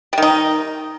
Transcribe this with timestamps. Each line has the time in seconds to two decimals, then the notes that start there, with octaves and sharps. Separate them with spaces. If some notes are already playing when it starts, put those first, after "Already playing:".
0.13 G3
0.18 D#3
0.22 D#4